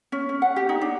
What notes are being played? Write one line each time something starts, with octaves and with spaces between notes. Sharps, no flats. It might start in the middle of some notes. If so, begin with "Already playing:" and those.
C#4
C#4
F#5
G4
D#4
D4